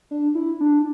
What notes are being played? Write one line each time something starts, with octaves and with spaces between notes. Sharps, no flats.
D4
E4
D4